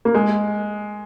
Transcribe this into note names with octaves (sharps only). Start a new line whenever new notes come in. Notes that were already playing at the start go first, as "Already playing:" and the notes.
A#3
G#3